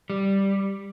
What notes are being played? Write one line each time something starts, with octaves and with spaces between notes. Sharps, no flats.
G3